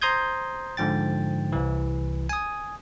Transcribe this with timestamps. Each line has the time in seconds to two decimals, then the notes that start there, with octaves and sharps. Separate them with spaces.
0.02 C5 A#5 C6 D#6 G6 G#6
0.77 G#2 D3 F3 G5 A6
1.52 C2 E3
2.29 G#5 D#6